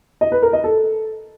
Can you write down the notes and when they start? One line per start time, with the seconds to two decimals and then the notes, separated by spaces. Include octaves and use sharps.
0.21 D#5
0.32 B4
0.42 A#4
0.53 D#5
0.64 A4